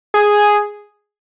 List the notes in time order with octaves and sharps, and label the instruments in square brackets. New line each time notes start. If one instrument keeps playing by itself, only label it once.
[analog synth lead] G#4